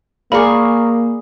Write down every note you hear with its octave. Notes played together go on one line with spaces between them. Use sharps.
A#3 G#4 A#4 D5 F5 B5 C#6